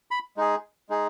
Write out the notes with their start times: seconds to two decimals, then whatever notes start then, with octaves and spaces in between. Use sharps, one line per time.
0.11 B5
0.37 G#3 D#4 G#4
0.89 G#3 D#4 G#4